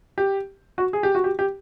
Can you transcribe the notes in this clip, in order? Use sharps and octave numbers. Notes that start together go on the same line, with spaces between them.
G4
F#4
G#4
G4
F#4
G4
G4